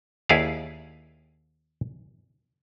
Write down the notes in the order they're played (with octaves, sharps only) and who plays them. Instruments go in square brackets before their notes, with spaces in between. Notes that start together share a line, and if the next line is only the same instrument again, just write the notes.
[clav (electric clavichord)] D#2 E4 G#4 D5 F5